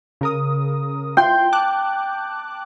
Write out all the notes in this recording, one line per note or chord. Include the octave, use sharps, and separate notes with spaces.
C#3 A#4 D#6
F4 G5 C6
A5 D6 F#6